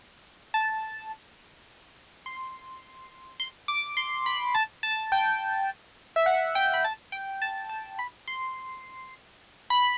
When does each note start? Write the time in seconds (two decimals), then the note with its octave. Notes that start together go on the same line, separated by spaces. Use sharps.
0.54 A5
2.26 C6
3.40 C6
3.68 D6
3.97 C6
4.26 B5
4.55 A5
4.83 A5
5.12 G5
6.16 E5
6.26 F#5
6.55 G5
6.74 B5
6.84 A5
7.12 G5
7.42 A5
7.69 A5
7.99 B5
8.28 C6
9.70 B5